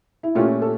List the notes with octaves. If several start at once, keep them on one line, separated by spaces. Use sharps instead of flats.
E4
A#2 A3 C#4 F4 G4
A4